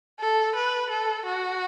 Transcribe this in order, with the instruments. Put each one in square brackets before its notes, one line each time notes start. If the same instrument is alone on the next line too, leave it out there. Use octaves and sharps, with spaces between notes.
[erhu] A4
B4
A4
F#4